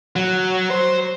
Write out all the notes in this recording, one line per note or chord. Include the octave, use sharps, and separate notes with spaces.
F#3
C5